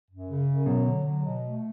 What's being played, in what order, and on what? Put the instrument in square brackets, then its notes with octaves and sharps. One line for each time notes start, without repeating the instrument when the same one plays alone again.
[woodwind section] F#2
C#3
F#2
[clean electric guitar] B2 [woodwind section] F#3
[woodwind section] D3
F#3
B2
A3